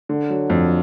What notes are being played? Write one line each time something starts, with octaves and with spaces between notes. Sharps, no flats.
D3
F#3
F2